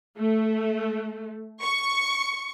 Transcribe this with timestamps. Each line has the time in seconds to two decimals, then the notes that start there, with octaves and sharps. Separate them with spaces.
0.17 A3
1.63 C#6